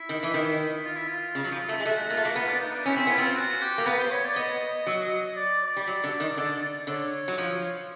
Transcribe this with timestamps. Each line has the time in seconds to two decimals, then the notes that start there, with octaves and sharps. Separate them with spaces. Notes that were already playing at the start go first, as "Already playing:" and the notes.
Already playing: E4
0.09 D#3
0.23 E3
0.34 D#3
0.85 F4
0.96 E4
1.07 F4
1.35 C#3
1.44 F#3
1.51 F3
1.68 A3
1.80 G#3
1.85 A3 F#4
2.10 A#3 F4
2.17 A3
2.24 A#3 F#4
2.35 B3 F4
2.48 D4
2.60 D#4
2.73 D4
2.85 C#4 E4
2.97 C4
3.07 B3 F4
3.18 C4
3.36 F#4
3.61 G4
3.78 A#3
3.86 B3 B4
3.99 C5
4.11 C#5
4.24 D5
4.36 B3 D#5
4.87 F#3
5.36 D5
5.62 D5
5.77 G3
5.87 F#3
6.04 D3
6.20 D#3
6.37 D3
6.87 D3 C#5
7.28 F#3
7.38 F3